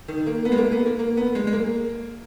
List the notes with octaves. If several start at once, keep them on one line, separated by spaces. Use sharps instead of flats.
D#3
A#3
B3
G#3
A#3
B3
A#3
A#3
B3
G#3
G#3
A#3